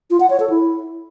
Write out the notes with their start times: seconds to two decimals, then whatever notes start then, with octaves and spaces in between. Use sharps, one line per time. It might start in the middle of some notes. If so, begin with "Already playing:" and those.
0.10 F4
0.20 F#5
0.30 C#5
0.40 A4
0.50 E4